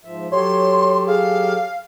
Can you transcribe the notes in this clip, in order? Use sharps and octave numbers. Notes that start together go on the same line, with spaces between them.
G#2 F3 E5
F#3 G4 A4 C#5 C6
G#4 F5